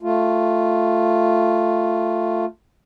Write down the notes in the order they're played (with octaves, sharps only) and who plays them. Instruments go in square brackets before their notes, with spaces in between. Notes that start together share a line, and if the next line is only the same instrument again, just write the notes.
[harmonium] A3 F4